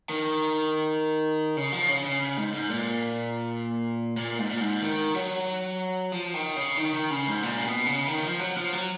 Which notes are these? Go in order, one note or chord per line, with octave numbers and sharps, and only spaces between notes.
D#3
C#3
F3
C#3
C#3
C#3
G#2
G#2
A#2
A#2
G#2
A#2
G#2
D#3
F#3
F3
D#3
C#3
D#3
D#3
C#3
G#2
A#2
C#3
B2
C#3
D#3
F3
F#3
F3
F#3